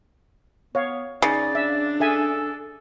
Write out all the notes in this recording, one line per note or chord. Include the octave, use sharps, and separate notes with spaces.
B3 C#5 F5
C#3 D#4 D5
D4 E5
G#4 A4 E5 G#5